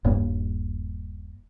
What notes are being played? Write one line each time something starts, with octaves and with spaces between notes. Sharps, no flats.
D#1 G2 A#3